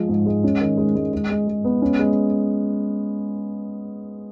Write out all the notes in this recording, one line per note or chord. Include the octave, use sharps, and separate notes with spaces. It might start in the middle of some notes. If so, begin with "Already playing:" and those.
Already playing: F3 G#3
G#2
G#3
C#4
D#3
G#3
G#3
G#3
G#3
G#3
B3
C#4
G#3